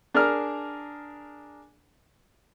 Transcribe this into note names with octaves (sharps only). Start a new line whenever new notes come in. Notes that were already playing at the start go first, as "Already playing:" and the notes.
D4 G#4 A#4 F6